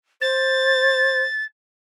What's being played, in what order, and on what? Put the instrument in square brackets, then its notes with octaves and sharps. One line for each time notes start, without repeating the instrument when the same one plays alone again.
[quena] C5 [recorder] A6